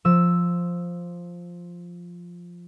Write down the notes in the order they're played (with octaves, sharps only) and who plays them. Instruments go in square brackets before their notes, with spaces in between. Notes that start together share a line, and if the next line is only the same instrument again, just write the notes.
[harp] F3 E6